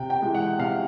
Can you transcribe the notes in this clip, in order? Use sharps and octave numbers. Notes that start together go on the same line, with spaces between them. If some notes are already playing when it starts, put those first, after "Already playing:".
Already playing: C3 G5
G5
E3 G#3
F#5
C3 F5